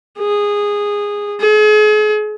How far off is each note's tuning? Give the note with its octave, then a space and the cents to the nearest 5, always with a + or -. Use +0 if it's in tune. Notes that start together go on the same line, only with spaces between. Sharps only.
G#4 -15
G#4 +40